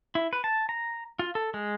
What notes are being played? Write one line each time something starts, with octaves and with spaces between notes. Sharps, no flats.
E4
B4
A5
A#5
F4
A4
G#3